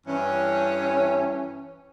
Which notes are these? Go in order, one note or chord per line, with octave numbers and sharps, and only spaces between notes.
G2 E3 C#4